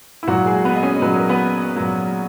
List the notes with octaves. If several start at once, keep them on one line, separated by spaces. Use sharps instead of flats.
E4
A#2 F#3 F#4
G#3 G#4
B3 B4
D#5
C#4 C#5
A#2 F#3 B4
A#4
B3 B4
A#2 F#3